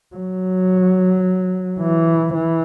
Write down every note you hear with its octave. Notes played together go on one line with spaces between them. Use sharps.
F#3
E3
E3